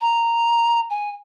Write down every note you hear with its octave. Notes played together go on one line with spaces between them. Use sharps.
A#5
G#5